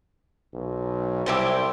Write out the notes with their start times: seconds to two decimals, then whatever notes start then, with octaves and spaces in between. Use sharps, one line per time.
0.54 B1
1.26 C2 E4 G4 C5